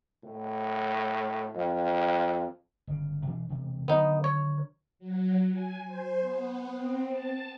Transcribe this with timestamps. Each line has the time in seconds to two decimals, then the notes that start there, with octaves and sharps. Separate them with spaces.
0.24 A2
1.55 F2
2.87 G1 C#3
3.25 B2 E3 D4
3.49 E1 C3
3.88 D3 D#3 F#3 B3 D#4
4.24 C#5
4.99 F#3
5.53 G#5
5.87 C5
6.20 B3
6.72 C4
7.10 A5